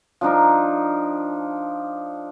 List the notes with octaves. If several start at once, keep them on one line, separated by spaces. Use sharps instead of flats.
F3 D4 D#4 A#4